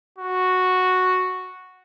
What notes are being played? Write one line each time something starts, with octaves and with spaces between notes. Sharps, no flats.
F#4